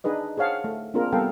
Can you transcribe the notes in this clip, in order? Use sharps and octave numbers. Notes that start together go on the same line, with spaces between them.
D4 D#4 G#4 B4 D#5
G#4 C5 C#5 F5 F#5 A5
A3
A#3 C4 D4 F4 G#4 A#4
G3 B3 A4 A#4 F5 G5